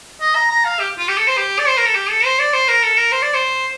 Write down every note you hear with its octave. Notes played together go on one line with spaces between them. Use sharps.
D#5
A#5
A#5
F5
G4
F4
G4
A4
C5
G4
D5
C5
A#4
A4
G4
A4
C5
D5
C5
A#4
A4
A#4
C5
D5
C5